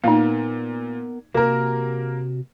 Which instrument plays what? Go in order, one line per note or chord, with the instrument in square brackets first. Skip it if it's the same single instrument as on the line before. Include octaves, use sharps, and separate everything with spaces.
[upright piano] A#2 [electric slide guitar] B3 A#4 [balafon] D#4 F5
[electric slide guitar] C3 F#4 G4 [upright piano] A#3 A#4